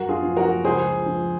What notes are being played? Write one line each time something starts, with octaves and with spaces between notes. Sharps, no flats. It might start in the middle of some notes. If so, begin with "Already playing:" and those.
Already playing: F#2 F#3 F#4 A#4
F4 G#4
F3
F#4 A#4
C#2 G#4 C5
F3